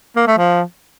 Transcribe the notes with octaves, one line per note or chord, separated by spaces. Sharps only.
A#3
A3
F3